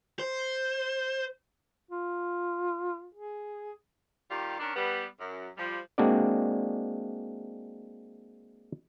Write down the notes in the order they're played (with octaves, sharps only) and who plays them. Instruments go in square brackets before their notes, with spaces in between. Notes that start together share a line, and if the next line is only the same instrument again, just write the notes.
[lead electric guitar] C5
[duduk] F4
G#4
[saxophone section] D#3 G3 F4 G4
D#3 C#4 D4
G3 B3
F#2
F3 G3
[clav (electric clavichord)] G#3 A#3 C4 D4 F#4 D5